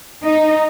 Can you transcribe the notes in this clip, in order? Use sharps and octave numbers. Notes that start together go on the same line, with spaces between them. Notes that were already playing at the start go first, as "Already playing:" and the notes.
D#4